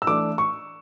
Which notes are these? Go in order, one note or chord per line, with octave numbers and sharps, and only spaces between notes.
E6
E3 A3 D4 D6
C#6